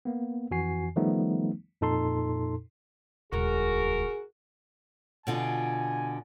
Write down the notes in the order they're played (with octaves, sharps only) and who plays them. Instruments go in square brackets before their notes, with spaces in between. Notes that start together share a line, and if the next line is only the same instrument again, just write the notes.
[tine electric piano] A#3 B3
F2 E3 F#4 G#5 C7
D#3 F3 G3 A3 B3 D#4
F2 A#2 D#4 A4 A5 C6
[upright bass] D#1 C#2 [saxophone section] F#4 A#4 [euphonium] G#4
[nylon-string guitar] B2 D3 F4 [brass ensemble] G#5